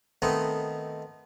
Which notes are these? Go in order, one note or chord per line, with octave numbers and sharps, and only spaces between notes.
D#3 A3 B3 C4 D#4